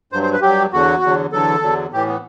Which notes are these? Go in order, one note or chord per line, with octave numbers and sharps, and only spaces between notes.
G2 F#3 C5
C5
B4
G2 F#3 G4
E2 D3 F#3 F#4
E2 D3 F#3
E2 D3 F#3 A4
E2 D3 F#3
A2 E3 G4
B3